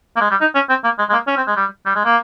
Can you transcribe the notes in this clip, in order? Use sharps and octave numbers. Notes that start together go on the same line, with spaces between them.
A#3
G#3
G3
D#4
C#4
C4
A#3
G#3
G#3
A#3
C#4
C4
G#3
G3
G3
G#3
A#3